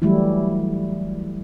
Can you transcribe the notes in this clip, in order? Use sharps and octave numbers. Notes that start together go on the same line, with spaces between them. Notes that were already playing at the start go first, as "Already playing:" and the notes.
E3 F#3 G3 A3 E4